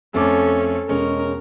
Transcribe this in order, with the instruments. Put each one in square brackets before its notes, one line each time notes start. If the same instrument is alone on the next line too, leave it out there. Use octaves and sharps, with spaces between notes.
[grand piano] F2 A3 D6 [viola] C#4 A4
[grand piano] E1 G#3 C#4 [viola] A#4